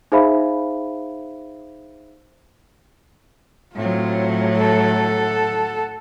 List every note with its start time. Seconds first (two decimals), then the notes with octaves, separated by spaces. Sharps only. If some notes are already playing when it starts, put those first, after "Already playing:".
0.12 D#4 G#4 C5 E5 F5 B5
3.75 A2 F#3 C4 F4
4.57 A4 F#5